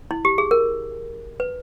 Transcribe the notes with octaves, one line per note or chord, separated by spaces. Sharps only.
E4
G4
G#4
A#4
B4